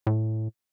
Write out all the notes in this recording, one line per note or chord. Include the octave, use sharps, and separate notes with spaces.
A2